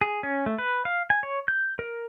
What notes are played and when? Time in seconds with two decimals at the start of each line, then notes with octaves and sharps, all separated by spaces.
0.01 G#4
0.23 C#4
0.46 A3
0.58 B4
0.85 F5
1.10 G#5
1.23 C#5
1.48 G6
1.79 A#4